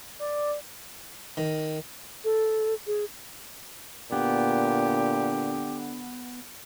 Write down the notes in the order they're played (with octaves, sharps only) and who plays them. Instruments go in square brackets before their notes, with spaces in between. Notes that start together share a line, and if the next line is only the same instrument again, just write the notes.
[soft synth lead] D5
[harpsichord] D#3
[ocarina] A4
G#4
[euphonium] A#2 [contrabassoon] D3 [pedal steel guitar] B3 [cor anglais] G4